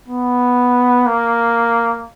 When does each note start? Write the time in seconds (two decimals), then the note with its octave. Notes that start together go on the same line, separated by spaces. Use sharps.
0.08 B3
1.06 A#3